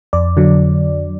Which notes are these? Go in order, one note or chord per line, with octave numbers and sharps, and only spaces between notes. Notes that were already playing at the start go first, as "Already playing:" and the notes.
F2 D5
D3 F#3